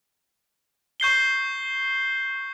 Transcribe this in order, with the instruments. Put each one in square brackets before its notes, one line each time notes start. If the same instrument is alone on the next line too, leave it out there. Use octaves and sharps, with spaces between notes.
[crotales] C#6 G6 C7 G7